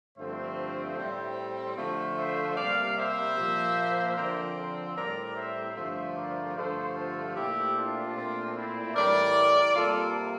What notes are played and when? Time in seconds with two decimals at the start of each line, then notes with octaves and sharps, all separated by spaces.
0.17 G2 D3 F3 A3 C4 C5 E5
0.97 A2 G3 C4
1.77 D3 F3 A3
2.17 C5 E5
2.57 C3 G3 A#3 D5 F5
2.96 C5 E5
3.36 A#2 F3 A#3
4.16 D3 F3 C4 A#4 D5
4.56 A4 C5
4.95 A2 G3 C4 A#4 D5
5.35 C5 E5
5.76 G2 D3 F3 A3 C5 E5
6.16 A#4 D5
6.55 G2 D3 F3 A3 A4 C5
6.95 F4 A4
7.35 A#2 A3 C4 E4 G4
7.75 D4 F4
8.15 A#2 A3 C4
8.54 C4 E4
8.95 A2 E3 G3 A#4 D5
9.75 C3 G3 A#3 F4 A4